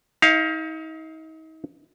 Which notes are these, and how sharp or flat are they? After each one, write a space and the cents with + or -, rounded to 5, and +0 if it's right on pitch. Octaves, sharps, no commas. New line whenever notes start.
D#4 +40 F5 +0